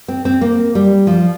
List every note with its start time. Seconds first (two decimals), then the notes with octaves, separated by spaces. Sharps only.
0.08 C4
0.25 C4
0.41 A#3
0.75 G3
1.07 F3